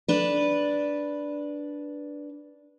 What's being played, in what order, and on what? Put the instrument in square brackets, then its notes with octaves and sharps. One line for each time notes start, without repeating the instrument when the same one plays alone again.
[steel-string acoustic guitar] D4 B4